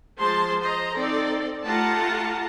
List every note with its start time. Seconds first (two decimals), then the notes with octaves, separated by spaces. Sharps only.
0.19 F3 G#3 C5 A5 C6
0.61 C5 D#5 A#5
0.96 C4 D#4 A4 D5
1.65 A3 F4 G4 F#5 A5 A#5